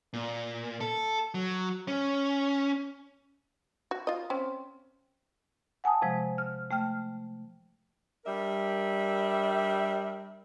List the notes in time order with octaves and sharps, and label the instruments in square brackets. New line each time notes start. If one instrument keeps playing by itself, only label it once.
[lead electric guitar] A#2
A4
F#3
C#4
[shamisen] F#4
F4 D#5
C4 C#4
[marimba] F#5 G#5 A5 D#6
C3 F3 G#3
F6
A3 G5 F6
[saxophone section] G3 D4 A#4 E5